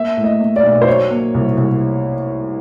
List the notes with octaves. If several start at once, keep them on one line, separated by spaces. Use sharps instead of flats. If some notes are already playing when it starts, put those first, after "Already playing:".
Already playing: A#3 E5
A2
D#5
A#3
D5
B1
C5
F#3 C#5
A#3
C2
C2